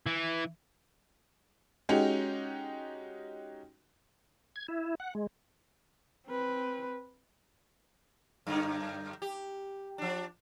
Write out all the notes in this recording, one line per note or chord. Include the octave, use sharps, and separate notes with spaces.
E3
G#3 C#4 D#4 F#4 G4
G#6
E4
F#5
G#3
C4 B4
F#2 D3 D#4
G4
F3 D4